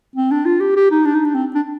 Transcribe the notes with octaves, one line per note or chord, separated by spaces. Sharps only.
C4
D4
F4
G4
G4
D#4
D4
D#4
D4
C4
D4